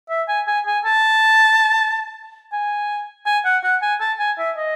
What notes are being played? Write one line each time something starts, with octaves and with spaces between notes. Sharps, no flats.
E5
G#5
G#5
G#5
A5
G#5
G#5
F#5
F#5
G#5
A5
G#5
E5
D#5